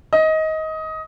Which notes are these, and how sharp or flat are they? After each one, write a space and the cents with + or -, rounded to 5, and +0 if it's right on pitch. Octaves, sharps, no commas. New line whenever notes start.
D#5 +20